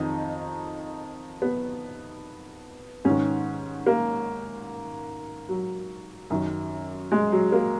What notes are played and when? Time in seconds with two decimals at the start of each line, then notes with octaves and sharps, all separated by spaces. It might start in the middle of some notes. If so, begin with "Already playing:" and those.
Already playing: F2 D#3 D#4
1.42 B3
3.05 G#2 D#3 C#4
3.86 A#3
5.49 F#3
6.30 F#2 D#3
7.12 G#3
7.32 F#3
7.52 A#3